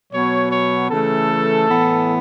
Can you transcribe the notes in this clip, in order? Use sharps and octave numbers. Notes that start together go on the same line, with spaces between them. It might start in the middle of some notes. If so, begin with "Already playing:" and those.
B2 F#3 B3 C#5
C#5
C#3 E3 A3 A4
A2 E3 B3